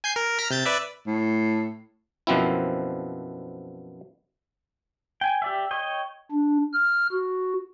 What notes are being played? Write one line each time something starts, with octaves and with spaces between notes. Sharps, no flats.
G#5 G6 C7
A#4
A#5 F6 B6
C3 G6 A6
B4 D5 E5
A2
F#2 B2 F3 C4 E4
G5 G#5
G4 D5 E5
C#5 D#5 G5
D4
F6
F#4